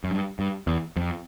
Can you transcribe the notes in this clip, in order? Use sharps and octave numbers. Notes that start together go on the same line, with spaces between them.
F#2
G2
G2
E2
F2